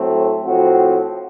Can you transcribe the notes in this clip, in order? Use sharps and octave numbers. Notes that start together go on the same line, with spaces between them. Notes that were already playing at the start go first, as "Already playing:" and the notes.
Already playing: A2 F#3 A3 C4
A2 F3 C4 F#4